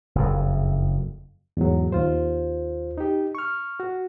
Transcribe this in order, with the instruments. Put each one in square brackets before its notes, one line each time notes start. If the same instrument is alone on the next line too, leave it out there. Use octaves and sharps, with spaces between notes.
[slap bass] F#1 F2
[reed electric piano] E2 G#2 F#3
D#2 F4 C5
D#4 G4
C#6 F6
F#4